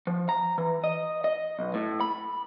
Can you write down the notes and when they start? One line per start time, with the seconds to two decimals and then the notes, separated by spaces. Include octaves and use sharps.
0.07 F3
0.29 A#5
0.58 E3
0.84 D#5
1.24 D#5
1.59 B1
1.74 A2
2.01 B5